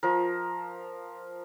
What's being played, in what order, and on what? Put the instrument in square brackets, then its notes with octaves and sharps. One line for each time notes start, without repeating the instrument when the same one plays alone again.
[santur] F3 A#4